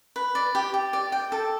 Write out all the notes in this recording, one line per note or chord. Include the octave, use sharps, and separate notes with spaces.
B4
D5
G4
G4
D5
G5
A4